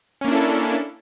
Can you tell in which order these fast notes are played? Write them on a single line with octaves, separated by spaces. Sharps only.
C#4 A#3 D4 E4 A4